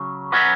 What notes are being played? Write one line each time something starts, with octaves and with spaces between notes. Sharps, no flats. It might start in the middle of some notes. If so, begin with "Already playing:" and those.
Already playing: C#3 F#3
F#3 C#4 F#4 B4